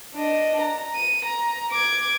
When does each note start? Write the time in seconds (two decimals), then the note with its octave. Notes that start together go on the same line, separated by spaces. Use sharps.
0.14 D4 D#5
0.61 A#5
0.95 D#7
1.25 A#5
1.72 D6 G#6